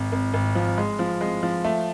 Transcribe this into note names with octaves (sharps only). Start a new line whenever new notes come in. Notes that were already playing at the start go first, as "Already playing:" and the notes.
Already playing: G#1
G#1
G#1
F3
G#3
F3
G#3
F3
A3